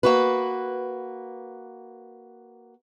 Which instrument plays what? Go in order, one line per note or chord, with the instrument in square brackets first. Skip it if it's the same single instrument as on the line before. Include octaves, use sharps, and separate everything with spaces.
[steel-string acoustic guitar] A#3 F#4 B4